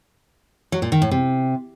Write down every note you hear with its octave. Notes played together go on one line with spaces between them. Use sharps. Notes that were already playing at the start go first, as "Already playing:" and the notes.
F#3
A#2
D#3
A2
C3